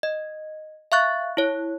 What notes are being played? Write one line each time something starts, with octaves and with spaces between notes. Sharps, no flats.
D#5
E5 F5 C#6 F#6 A6
E4 C#5